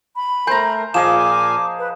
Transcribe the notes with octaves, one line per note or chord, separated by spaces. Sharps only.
B5
A3 A#4 C5 G#5 A#5 G6
A#2 F3 G#4 D#5 F5 G#5 D6 E7
B4